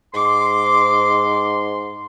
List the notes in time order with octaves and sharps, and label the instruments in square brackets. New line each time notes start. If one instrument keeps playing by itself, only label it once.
[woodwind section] G#2 C6 [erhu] D6